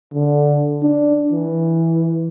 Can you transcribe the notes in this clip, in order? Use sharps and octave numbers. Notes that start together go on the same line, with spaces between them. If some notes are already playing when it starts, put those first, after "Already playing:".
D3
D4
E3